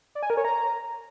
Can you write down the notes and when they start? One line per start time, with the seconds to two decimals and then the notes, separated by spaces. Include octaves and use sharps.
0.15 D5
0.23 G#5
0.30 A#4
0.37 C#5
0.45 A#5